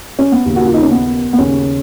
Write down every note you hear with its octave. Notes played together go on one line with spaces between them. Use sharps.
C#4
B3
D#2 C#3 A#3
F#4
F4
D#4
C#4
B3
B3
D#2 C#3 C#4